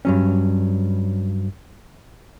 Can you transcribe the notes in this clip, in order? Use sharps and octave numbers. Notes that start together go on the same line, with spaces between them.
G2 F#3 C#4